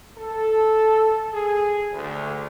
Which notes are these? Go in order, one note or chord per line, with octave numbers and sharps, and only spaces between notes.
A4
G#4
D2